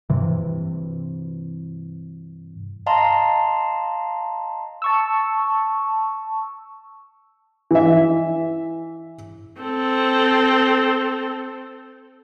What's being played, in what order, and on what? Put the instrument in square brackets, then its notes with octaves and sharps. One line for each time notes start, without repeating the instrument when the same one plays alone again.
[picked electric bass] G2 C3 E3
[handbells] D#5 F5 A5 A#5 C6
[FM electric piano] A5 C#6 E6
[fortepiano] E3 E5
[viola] C4 A4